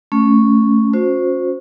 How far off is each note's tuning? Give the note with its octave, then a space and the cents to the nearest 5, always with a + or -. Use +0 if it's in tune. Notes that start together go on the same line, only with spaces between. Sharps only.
A3 +0 C#4 +0
C#4 +0 F#4 -40 C5 +0